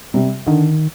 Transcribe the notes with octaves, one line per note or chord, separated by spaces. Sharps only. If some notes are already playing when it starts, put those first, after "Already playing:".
C3 G3
D3 D#3